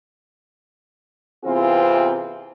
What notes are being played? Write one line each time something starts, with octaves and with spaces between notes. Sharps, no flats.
C3 E3 B3 C4 F4 G#4